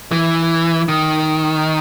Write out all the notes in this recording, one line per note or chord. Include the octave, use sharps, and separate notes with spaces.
E3
D#3